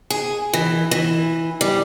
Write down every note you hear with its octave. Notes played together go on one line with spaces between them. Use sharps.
G#4
E3
E3
G3